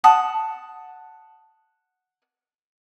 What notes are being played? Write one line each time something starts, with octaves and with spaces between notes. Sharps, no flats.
F#5 A5 D#6